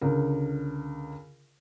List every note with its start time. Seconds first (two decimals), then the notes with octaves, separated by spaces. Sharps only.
0.01 C#2 D3 A#4